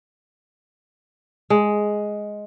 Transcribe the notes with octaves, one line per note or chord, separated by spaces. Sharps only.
G#3